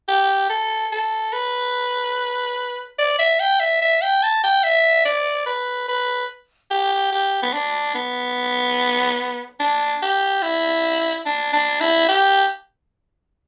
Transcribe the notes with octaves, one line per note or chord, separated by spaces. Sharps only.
G4
A4
A4
B4
D5
E5
G5
E5
E5
G5
A5
G5
E5
D5
B4
B4
G4
G4
B3
D4
B3
D4
G4
E4
D4
D4
E4
G4